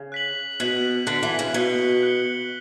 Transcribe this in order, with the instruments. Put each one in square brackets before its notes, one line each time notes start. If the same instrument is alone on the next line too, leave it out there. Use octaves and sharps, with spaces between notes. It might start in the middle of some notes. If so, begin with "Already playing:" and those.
Already playing: [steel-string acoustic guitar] C#3
[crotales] F#6 B6 F#7
[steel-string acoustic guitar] B2 [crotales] F#6 B6 F#7
[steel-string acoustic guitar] D3 [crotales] F#6 B6 F#7
[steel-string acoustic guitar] E3
C#3
[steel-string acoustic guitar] B2 [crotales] F#6 C#7 G7
[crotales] F#6 C#7 G7